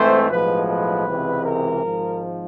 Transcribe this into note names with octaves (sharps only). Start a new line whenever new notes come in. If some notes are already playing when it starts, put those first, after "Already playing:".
Already playing: G#2 E3 A3 C4 C5
B1 A2 F3 G#3 B4
B4
C#2 C3 E3 G#3 C4
A#4
G#1 G#2 F3